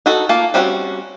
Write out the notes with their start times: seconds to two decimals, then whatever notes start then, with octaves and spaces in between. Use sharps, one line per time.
0.06 D#4 F#4 A4
0.29 A#3 F4 A5
0.54 G3 C4 C#4 F4 F#4